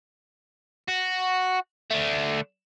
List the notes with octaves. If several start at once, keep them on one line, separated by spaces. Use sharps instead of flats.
F#4
D3 A3